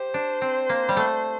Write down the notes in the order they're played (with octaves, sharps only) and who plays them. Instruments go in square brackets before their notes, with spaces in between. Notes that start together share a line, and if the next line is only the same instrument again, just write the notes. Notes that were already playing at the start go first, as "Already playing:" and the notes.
Already playing: [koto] G4 [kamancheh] C5
[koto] D4
C4
A#3
G3
A3